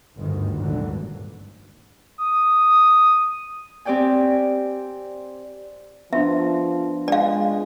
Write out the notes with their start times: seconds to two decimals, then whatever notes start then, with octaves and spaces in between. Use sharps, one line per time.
0.16 G1 D2 G#2 D#3
0.58 G#1 D#2 A#2 D3 E3 F#3
2.18 D#6
3.85 C4 G4 D5 G5 G#5
6.13 F3 B3 D4 F4 E5
7.08 G#3 D5 F5